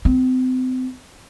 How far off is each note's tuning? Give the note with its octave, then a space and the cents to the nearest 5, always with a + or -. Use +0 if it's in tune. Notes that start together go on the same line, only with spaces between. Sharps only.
C4 -35